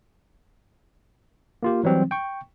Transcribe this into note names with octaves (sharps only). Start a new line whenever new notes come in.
A#3 F4 G4
E3 F#3 G3 C4
G5 C#6